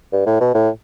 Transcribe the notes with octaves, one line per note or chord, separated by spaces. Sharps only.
G2
A2
B2
A2